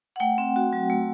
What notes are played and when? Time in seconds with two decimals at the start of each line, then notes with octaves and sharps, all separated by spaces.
0.16 F#5
0.20 A3 G5
0.38 C4
0.56 F#4
0.73 F#3
0.90 A3